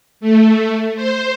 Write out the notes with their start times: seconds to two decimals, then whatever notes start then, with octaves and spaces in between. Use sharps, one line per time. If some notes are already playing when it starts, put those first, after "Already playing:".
0.20 A3
0.96 C5